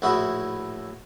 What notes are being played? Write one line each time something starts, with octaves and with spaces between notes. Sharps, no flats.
A#1 A2 E4 F#4 D#6